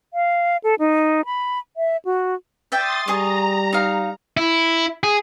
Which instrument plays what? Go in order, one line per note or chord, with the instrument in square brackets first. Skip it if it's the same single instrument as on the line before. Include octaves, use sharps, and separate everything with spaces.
[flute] F5
A4
D#4
B5
E5
F#4
[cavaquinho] D5 E5 G5 [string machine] C6 D#6 A6
[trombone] G3 [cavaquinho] G#4 D#5 C#6 [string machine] A#5
[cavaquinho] D#4 F5
[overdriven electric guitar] E4
G#4